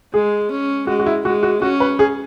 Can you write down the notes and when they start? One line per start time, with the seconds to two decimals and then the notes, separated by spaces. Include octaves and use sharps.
0.14 G#3 G#4
0.51 C#4
0.87 G#3 F#4
0.99 F#4
1.06 E4
1.25 G#3 F#4
1.43 F#4
1.62 C#4 F#4
1.80 B4
1.99 G#4